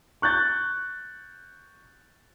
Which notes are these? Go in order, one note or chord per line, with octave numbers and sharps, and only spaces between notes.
C#6 F#6 G6 A6